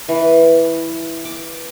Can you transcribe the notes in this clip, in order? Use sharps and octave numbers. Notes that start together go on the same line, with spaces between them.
E3
D6